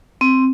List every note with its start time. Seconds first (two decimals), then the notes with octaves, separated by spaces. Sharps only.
0.21 C4